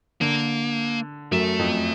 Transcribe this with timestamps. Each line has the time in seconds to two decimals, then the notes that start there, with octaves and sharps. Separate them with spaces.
0.21 D3 A#3
1.31 F#2 F#3 A3
1.59 F2 F3